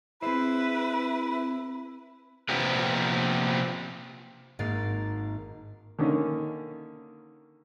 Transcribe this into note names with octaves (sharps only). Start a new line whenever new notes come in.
C4 E4 G#4 B4 C5
C3 F3 A#3 B3 G4 B4
G#1 G#2 A#3 A6 C7
D3 D#3 A#3 C#4